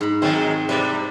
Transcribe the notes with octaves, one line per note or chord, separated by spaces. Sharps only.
G#2 B5
D#3 F#3 G#3 C4
C3 G3 B4 D5 E5